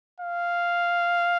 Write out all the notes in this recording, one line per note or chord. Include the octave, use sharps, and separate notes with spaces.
F5